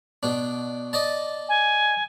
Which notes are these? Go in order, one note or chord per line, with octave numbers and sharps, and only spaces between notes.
B2 D4
D5 D#5 A5
G#5